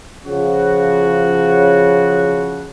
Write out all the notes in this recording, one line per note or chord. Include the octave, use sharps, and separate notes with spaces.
C#3 F3 F#4